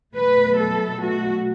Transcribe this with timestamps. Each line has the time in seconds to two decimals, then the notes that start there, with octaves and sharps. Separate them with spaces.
0.13 B2 F#3 A3 B4
0.59 A4
1.03 F#4